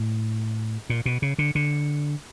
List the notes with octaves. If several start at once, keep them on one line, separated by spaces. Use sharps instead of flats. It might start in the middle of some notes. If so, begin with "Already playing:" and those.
Already playing: A2
A#2
B2
C#3
D3
D3